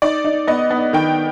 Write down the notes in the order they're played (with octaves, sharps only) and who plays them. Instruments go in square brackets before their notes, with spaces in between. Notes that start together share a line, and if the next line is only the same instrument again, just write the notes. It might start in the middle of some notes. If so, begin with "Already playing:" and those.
[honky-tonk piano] D#4 D5
D#4
B3 D#5
B3
D#3 G5